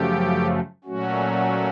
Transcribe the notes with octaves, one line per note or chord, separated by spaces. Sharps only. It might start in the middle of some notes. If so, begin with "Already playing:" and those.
Already playing: F#2 C#3 F3 A3 G4
A#2 F#3 A3 C#4 F#4